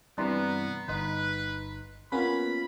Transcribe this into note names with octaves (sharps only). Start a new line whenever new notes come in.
G2 C3 E3 B3 D5 A#5 C6
G1 D#4 B4 C6
A#3 B3 C#4 F4 B4 B5